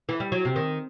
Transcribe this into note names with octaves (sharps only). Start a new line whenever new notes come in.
E3
G3
F#3
C3
D#3